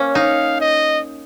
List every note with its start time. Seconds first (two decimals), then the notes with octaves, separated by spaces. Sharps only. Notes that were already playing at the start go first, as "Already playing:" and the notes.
Already playing: A#3 C#4
0.15 D#4 F5
0.60 D#5